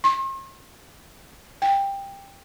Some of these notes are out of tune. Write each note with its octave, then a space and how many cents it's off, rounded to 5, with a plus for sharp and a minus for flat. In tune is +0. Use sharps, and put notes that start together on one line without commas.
C6 +45
G5 +15